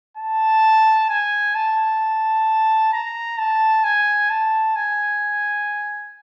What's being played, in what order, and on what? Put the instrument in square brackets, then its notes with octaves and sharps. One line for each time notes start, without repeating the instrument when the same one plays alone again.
[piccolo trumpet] A5
G#5
A5
A#5
A5
G#5
A5
G#5